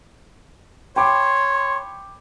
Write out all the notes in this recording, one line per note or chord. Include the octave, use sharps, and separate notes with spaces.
C#5 G5 B5 C6 D6